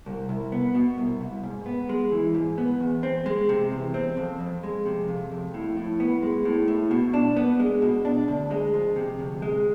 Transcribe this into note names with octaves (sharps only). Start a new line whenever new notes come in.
C2
C2
B3
B2
C2
C2
G#2
B3
G#3
E3
G#2
B3
E2
C4
G#3
C3
E2
C4
F2
F2
G#3
C3
F2
F2
A2
A2
B3
G#3
A2
A2
B2
D4
B3
G#3
B2
D4
D2
G#3
F3
C3
D2
G#3